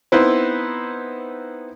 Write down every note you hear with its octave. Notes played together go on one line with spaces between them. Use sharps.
B3 C4 D#4 E4 B4 C5